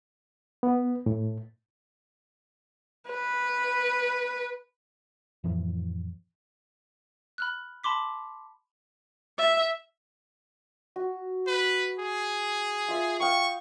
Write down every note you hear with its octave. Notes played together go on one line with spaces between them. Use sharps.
B3
A2
B4
F2 A2 E3 F3
B5 F6 F#6
A5 B5 C6 D6 B6
E5
F#4
B4
G#4
F4 E5
F5 G5 C#6 D#6